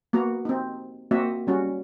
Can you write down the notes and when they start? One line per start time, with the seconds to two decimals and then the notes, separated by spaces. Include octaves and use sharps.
0.13 A#3 B3 F#4 A#5
0.45 C4 D#4
1.11 A#3 C4 F#4 D#5 E5
1.47 G3 C#4 F#4